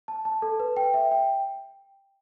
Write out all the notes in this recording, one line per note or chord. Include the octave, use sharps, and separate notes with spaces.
A5
A5
A4
B4
G5
E5
G5